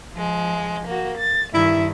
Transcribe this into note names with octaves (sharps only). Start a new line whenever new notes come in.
F3 G#3
A#3 F#4
A6
G2 D#3 E4